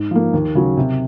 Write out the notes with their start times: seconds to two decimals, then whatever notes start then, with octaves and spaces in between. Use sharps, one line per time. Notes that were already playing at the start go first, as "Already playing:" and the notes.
Already playing: G#2
0.11 F3 A#3
0.34 D#2
0.55 C#3 F#3
0.77 C3